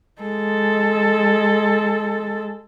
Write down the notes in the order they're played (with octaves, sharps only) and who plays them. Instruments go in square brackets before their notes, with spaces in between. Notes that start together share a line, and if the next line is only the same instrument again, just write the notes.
[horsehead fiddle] G#3 A4